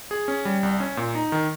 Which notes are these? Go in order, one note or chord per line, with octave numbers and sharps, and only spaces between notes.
G#4
C#4
G3
C2
C#4
A#2
D#4
D#3